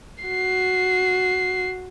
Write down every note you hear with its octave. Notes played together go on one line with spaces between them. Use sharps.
F#4 C7